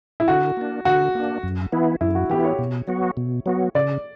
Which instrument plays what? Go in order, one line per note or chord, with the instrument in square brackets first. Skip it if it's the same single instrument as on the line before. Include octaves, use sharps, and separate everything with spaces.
[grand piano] E4
[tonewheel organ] D3 [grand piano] F#4
[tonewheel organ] A#3 D4
[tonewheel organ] D3 [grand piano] F#4
[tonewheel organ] A#3 D4
F#2
E3 B3 E4
[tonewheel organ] F#2 [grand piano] E4
[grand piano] F#4
[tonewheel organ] E3 B3 E4 [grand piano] G4
[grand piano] C#5
[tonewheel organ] B2
F#3 B3 F#4
B2
F#3 B3 F#4
[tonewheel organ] C#3 [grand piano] D5